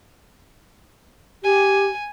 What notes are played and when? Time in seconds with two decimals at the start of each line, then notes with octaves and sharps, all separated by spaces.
1.44 G4 G#5